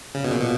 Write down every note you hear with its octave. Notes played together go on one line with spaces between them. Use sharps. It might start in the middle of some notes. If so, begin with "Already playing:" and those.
C#3
B2
A#2
B2